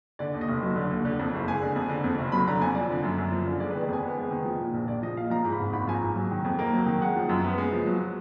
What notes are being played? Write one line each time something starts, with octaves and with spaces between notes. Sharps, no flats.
D3 D5
D#2
D#5
F1
F#3
D3
D#2
D3
F2
F#1
G#3 G#5
D3
F2
D3
F2
F1
F#3 B5
D3 A#5
F2 G#5
F3 D5
D3
F#2
F#2
F3
D3
G#3 D5
B4
D#3
D5
F2 G#5
B3
G#3
D#3
F3
A#2
A#1
A#1 D5
F3 D#5
A#2 F5
F3 A#5
G#2
B5
G#1
G#1 B5
F3 G#5
A#5
G#2
F#3
D#3
F2
A#3
F#3
D#3
G#3 F#5
F3
F#2
B3
G#3
F3
F#3